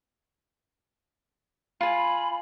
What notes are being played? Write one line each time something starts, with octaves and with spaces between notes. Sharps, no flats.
F4 G#5 B5